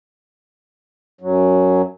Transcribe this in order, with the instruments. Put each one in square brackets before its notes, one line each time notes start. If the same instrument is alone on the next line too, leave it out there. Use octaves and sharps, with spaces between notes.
[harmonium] F#2 F#3